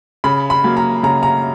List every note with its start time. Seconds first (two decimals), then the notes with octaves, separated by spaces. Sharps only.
0.24 C#3 B5
0.50 B5
0.64 F#3 A#3
0.77 A#5
1.03 C#3 A#5
1.23 A#5